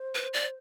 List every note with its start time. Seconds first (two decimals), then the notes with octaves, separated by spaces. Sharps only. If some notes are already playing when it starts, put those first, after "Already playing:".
Already playing: C5
0.15 B4
0.33 D5